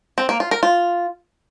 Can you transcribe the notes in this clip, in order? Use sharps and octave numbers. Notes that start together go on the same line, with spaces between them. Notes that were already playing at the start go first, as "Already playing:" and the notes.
C4
A#3
F4
A#4
F4